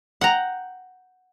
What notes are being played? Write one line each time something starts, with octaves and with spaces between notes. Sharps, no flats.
F#5 G5 A#5